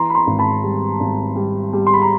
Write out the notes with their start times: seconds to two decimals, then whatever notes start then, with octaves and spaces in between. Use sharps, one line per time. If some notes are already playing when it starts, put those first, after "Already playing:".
Already playing: E3 A#5 C6
0.10 B5
0.14 A#5 C6
0.27 G#1
0.39 A5 B5
0.63 G3
1.00 G#1
1.36 G3
1.73 G3
1.87 C6
1.94 B5
2.02 A#5